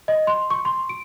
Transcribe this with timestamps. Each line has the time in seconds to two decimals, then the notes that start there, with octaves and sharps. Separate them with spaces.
0.08 D#5
0.27 C6
0.50 C#6
0.65 C6
0.89 D7